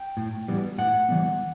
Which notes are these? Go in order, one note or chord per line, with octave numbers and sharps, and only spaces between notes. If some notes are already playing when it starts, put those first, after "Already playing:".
Already playing: G5
A2
E3 G3 B3
A2 F#5
E3 G3 B3